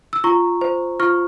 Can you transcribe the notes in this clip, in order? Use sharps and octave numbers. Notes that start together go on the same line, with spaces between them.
E6
F4 A#5 C#6
C5
F4 C#6 F6